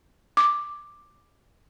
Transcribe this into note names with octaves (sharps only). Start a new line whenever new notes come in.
D6